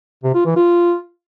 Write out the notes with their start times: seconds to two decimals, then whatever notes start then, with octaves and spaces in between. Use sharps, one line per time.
0.24 C3
0.35 F4
0.46 E3
0.57 F4